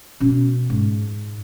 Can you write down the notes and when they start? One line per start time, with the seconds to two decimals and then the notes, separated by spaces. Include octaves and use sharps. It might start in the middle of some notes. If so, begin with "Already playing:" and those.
0.20 B2 C#4
0.70 G#2